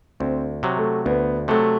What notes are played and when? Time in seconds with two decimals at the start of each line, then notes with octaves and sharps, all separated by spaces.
0.20 D2 C4
0.63 C3 F#3
0.77 A3
1.06 D2 B3
1.48 C3 F#3 A3